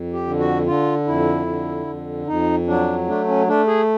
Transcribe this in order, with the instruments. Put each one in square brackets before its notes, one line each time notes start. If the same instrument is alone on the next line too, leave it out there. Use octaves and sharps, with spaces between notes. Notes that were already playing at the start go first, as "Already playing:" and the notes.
Already playing: [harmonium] F2
G4
D3
F#4
D3 F4
F2 E4
D3
F2
F2 D#4
F#3 D4
A3 D4
C#4
A3 D4
G#4